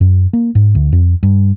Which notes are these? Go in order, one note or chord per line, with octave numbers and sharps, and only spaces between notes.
F#2
A#3
G#2
D2
F2
G2